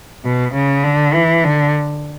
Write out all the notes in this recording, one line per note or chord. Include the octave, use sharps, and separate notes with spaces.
B2
C#3
D3
E3
D3